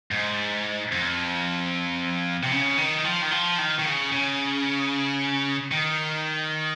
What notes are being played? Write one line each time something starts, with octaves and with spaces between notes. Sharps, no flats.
G#2
F2
C3
C#3
D#3
F3
D#3
F3
D#3
D#3
C#3
C#3
D#3